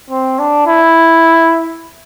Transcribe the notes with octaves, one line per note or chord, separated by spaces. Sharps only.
C4
D4
E4